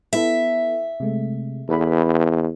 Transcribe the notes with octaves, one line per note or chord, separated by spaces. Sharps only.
B3 E4 A4 E5
C3 G#3 A3
E2 A4 B4 B5